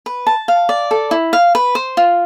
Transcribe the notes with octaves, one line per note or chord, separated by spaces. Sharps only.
B4
A5
F5
D5
A4
E4
F5
B4
C5
F4